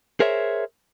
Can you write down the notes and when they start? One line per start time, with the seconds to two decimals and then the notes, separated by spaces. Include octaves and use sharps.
0.20 G#4 A#4 C5 C#5 E5